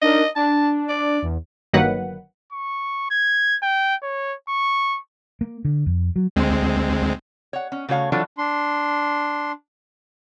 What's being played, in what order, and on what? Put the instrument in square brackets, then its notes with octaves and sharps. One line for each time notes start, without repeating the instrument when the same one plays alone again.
[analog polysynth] D4 D#4 A#4 [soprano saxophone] D#5
[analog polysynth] D4 [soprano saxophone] A5
[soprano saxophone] D5
[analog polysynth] E2
[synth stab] G1 D#3 F#3 A#3 B4 F#5
[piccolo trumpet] C#6
G#6
G5
C#5
C#6
[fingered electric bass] A#3
D3
F2
F#3
[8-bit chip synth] D2 G#3 C4
[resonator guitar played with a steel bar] C#5 F#5
C#4
C#3 A3 F#4 C#5 F5
E3 F#3 D4 F4 A4 C#5
[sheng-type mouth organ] D4 C6